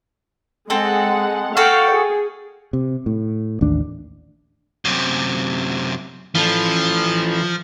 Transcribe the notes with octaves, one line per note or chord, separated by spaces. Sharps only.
G#3 C4 A4 F#5
F#4 A4 F5 G5
G#4
C3
A2
A1 D#2 D4
F#2 C3
E3 F3 A4